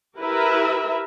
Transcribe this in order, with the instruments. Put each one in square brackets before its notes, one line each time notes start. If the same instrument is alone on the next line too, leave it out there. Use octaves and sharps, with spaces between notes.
[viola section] E4 G4 A#4 B4 E5